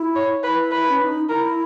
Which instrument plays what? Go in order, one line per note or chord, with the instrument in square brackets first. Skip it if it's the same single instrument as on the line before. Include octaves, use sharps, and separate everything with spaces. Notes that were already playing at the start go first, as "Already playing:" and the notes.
Already playing: [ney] E4
[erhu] C#5
[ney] E4 [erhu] B4
[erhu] B4
[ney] C#4
D#4
[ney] E4 [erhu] A#4